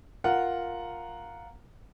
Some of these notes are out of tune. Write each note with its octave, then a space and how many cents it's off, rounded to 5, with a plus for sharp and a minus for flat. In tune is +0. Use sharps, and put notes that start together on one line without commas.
F4 +5 A#4 +0 F#5 +0